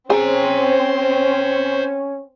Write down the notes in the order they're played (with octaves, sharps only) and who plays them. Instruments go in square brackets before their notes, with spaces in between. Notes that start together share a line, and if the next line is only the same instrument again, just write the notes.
[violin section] C4 [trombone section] C#4 [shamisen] G#4 [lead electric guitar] C5 A#5